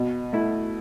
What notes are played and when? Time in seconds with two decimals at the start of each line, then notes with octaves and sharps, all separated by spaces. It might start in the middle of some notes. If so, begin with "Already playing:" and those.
Already playing: B2
0.33 A3 E4